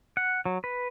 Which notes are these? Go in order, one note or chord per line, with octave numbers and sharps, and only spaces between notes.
F#5
F#3
B4